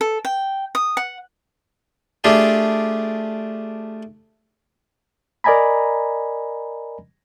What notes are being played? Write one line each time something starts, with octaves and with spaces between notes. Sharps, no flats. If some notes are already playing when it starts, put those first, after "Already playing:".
A4
G5
D#6
F#5
A3 D4 F4 G4 G#4
A#4 D5 D#5 G#5 A#5 B5